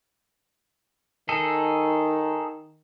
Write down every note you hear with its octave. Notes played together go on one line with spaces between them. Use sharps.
D#3 D#4 G#4 A4